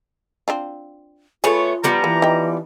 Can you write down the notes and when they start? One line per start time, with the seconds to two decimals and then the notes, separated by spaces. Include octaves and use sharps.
0.48 C4 D4 F4
1.44 A3 B3 F4 G#4 C#5
1.84 F3 G3 B3 A#5
2.04 E3 A#3
2.22 D#4 G5